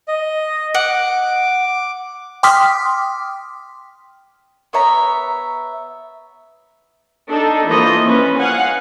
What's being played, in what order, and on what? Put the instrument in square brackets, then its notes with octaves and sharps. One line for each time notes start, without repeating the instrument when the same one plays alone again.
[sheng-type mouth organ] D#5
[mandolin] F#5 [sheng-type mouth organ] D6
[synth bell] G5 C6 D6 D#6 F6 B6
[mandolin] B3 C#5 E5 A#5
[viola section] D4 D#4 A4
E3 F3 A#3 D#5
C#4 B4
F5 F#5 G#5